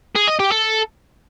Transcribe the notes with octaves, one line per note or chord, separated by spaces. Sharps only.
G#4
D#5
G4
A4